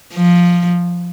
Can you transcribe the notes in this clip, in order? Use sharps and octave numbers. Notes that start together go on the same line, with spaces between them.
F3